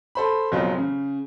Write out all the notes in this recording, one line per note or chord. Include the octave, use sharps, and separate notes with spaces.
A4 C5 B5
F#1 F2 B2 F#3 F4 G#4
C#3